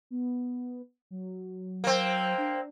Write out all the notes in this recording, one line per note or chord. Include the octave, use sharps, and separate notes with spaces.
B3
F#3
A#3 C4
D4